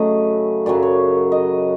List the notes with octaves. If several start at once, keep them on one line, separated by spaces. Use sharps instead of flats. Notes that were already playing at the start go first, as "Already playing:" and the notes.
Already playing: C#3 F#3 A3 D#5
F#2 C#3 F#3 D5
C#5
D#5